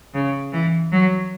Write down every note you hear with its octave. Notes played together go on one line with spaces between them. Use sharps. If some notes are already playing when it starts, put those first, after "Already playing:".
C#3
E3
F#3